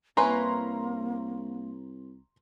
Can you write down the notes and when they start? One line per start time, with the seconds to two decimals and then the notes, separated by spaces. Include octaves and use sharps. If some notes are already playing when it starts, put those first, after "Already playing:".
0.17 C2 A#3 C#4 E4 B4 A#5 C6